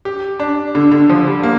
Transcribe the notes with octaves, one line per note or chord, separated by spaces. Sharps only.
G4
D4
D3
D3
F3
G3
A#3